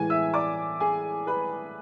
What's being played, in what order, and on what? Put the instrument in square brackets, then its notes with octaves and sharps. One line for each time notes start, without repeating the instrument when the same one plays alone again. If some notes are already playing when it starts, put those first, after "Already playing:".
Already playing: [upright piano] A2 E3 G#3 G#5 G#6
E5 E6
D5 D6
G#4 G#5
B4 B5